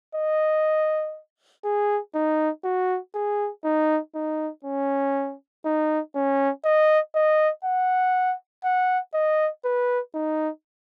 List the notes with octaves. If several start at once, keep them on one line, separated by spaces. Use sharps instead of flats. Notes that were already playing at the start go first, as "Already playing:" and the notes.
D#5
G#4
D#4
F#4
G#4
D#4
D#4
C#4
D#4
C#4
D#5
D#5
F#5
F#5
D#5
B4
D#4